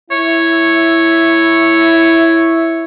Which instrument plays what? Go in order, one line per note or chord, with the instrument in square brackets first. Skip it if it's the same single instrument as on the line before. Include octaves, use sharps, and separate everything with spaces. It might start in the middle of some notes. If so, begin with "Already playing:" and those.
[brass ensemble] E4 E5 [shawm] C#5